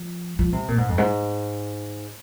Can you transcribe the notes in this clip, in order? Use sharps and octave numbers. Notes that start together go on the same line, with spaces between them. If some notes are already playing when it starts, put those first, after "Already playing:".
Already playing: F3
F3
C3
A#2
G#2
F2
G#2